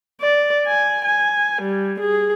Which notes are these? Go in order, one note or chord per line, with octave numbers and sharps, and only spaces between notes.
D5
G#5
G#5
G3
G#4